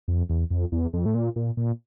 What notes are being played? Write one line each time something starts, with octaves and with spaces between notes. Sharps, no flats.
F2
E2
F2
E2
F2
A2
A#2
A#2
A#2